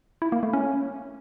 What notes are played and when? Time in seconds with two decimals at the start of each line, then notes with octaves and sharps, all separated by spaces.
0.22 E4
0.32 A#3
0.43 A3
0.53 C#4